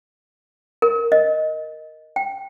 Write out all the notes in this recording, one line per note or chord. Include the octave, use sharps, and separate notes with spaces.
A#4
D#5
G5